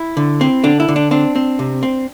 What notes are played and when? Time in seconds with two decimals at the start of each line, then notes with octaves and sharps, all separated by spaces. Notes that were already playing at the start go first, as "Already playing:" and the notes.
Already playing: E4
0.17 D3
0.41 C4
0.64 D3 D4
0.80 E4
0.88 D3
0.96 D4
1.11 C4 D4
1.36 C4
1.59 C3
1.83 C4